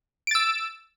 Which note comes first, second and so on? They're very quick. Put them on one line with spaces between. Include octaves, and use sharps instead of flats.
D7 A6 E6